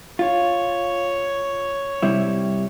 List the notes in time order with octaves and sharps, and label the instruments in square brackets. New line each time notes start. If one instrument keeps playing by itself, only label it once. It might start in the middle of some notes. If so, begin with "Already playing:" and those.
[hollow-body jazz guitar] F4 [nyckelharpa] C#5
[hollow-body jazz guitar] C3 G3 E4